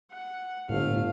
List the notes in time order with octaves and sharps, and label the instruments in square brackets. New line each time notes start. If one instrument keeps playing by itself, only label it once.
[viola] F#5
[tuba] G1 [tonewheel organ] A2 [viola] A3 F5